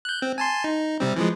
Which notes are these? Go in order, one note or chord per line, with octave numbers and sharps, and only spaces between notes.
F#6 G6
C4
G#5 A5 C6
D#4
C3 G3 C4
E3 F3 G#3